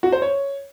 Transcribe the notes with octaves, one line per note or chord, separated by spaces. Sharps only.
F#4
C5
C#5